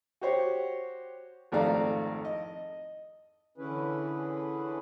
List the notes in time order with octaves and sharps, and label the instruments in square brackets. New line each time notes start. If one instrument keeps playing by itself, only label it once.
[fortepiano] F#4 G4 C5 C#5
G#1 F2 A3 D5 F5 A#5
D#5
[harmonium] D3 E3 C#4 E4 G#4 B4